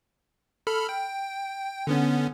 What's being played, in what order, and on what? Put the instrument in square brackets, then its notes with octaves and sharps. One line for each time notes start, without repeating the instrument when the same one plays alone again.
[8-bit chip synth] A4 B5 F6
G5
D3 B3 C#4